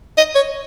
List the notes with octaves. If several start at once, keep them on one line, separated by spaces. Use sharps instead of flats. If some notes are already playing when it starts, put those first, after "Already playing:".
D#5
C#5